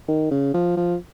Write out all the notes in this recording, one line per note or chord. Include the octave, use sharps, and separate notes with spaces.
D#3
C#3
F3
F3